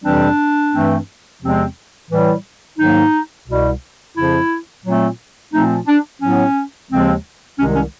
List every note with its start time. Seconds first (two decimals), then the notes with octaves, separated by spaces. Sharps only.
0.04 F2 C3 E3 G3 C4 D4
0.73 G2 E3 A3 C4
1.41 E2 C3 F3 G#3 C4
2.10 A2 E3 G3
2.78 G#2 D#3 F#3 A#3 D#4
3.47 C2 B2 G3
4.16 F2 C#3 F3 E4
4.84 A#2 F#3 A3 C4
5.53 A#2 F3 A3 C4 D#4
5.87 D4
6.21 A2 F#3 B3 C#4
6.90 D#2 C#3 F3 G#3 C4
7.58 C2 C3 D#3 G#3 C#4
7.75 C#4